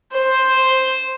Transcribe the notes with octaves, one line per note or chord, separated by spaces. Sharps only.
C5